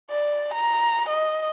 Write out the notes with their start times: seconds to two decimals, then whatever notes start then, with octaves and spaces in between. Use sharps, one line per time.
0.11 D5
0.54 A#5
1.09 D#5